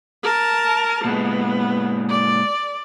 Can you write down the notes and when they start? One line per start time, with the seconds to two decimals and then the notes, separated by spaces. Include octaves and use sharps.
0.23 A#4 A5
1.05 A#2 G#3 B3
2.09 D5